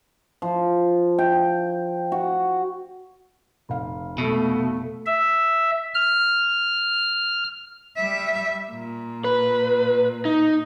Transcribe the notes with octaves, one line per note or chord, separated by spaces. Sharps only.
F3
G5
F#4
F1 F5
B2 A3
E5
F6
G3 E5
A#2
B4
D#4